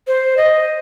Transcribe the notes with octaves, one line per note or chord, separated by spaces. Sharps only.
C5
D#5